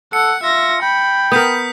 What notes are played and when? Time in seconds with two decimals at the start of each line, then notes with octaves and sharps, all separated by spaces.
0.13 A4 F#5 C#7
0.43 F4 E5 A#6
0.82 G5 B5
1.32 B3 A#4 D#6 G6 B6